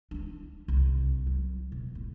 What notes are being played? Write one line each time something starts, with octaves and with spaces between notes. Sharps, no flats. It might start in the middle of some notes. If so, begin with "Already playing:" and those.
F3 D4
C2
F#3
B2
A2